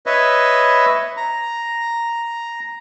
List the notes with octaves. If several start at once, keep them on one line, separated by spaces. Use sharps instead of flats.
B4 C#5 D#5 E5
A#5